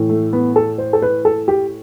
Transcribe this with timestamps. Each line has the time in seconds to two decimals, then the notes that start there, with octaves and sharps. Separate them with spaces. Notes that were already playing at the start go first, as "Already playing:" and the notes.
Already playing: A2 E3
0.09 A3
0.33 B3
0.56 A4
0.78 C5
0.93 A4
1.02 B4
1.25 A4
1.48 G4